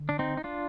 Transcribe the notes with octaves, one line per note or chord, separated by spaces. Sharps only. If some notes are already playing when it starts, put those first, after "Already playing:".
Already playing: D3
D4
C4 D#4
D#4
D4 F4